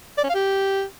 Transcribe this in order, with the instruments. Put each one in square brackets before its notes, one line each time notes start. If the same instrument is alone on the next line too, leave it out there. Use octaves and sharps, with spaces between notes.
[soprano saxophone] D5
C#4
F5
G4